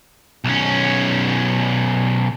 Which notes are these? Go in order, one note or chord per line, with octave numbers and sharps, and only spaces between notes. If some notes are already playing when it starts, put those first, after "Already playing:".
B1 C#4